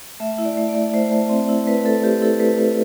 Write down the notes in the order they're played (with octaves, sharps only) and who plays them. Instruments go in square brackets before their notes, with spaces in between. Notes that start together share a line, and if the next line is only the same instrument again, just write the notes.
[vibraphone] A3 E5
E4
D5
A3
D5
A3
A3 C5
A3
C4
E4
A3 B4
A3 A4
A3 G4
E4 A4
A3 B4
A3